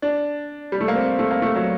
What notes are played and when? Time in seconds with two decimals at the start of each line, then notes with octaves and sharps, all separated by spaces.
0.02 D4
0.72 G3
0.81 A3
0.88 A#3
0.95 C4
1.19 A3
1.31 A#3
1.42 A3
1.56 F#3